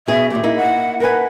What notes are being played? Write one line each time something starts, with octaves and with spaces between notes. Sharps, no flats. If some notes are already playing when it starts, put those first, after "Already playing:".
B2 G#4 E5
D#2 A#2 G4
A#3 D#4 E4
F#5
A#4 B4 G#5